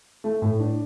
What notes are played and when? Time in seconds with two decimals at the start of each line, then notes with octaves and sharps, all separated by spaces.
0.24 A3
0.42 A2
0.60 D4